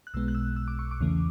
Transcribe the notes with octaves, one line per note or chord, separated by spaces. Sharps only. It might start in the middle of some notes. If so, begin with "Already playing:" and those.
F#6
B1 B2 G#3 B3 E6
F#6
E6
E6
D6
C#6
D6
E2 C#3 E3 A3